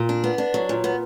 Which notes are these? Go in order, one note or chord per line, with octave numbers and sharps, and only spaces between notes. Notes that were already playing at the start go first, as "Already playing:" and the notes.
Already playing: A#2
D4
B3
D4
F#3
A#2
B3